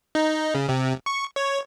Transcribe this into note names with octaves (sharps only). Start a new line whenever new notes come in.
D#4
C#3
C3
C#6
C#5